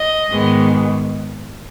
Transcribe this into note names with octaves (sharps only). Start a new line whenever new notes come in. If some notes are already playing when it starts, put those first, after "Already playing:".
Already playing: D#5
G#2 D#3 G#3 B3